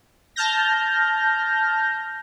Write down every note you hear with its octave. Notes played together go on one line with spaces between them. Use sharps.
A5 F6 G6 A#6